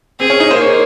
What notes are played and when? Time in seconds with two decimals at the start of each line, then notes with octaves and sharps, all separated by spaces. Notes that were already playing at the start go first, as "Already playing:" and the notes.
0.20 C4 G#4
0.30 C#4
0.40 D#4
0.50 A#3 C5
0.61 C#5